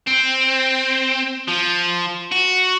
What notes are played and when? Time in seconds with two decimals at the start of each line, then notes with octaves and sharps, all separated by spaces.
0.07 C4
1.48 F3
2.32 F#4